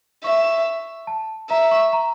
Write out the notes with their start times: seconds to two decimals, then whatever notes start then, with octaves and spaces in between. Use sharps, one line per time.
0.24 E5 C#6
1.07 A5
1.50 E5 A#5
1.71 C#6
1.93 A#5